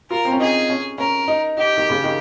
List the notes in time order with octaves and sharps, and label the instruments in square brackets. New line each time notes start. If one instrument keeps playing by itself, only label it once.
[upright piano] F4 [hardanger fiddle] A#4
[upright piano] C4
C#4
[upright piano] D#4 [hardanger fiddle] G#4
[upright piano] C#4
[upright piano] C#4 [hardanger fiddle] A#4
[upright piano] D#4
[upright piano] D#4 [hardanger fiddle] G4
[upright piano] D#3
C#3
D#3